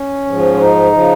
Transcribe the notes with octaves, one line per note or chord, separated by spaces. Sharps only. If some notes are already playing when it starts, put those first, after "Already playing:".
Already playing: C#4
G#2 F3
F4
D#4
C#3 F3